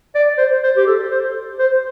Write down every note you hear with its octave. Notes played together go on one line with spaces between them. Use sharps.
D5
C5
C5
G4
A4
C5
C5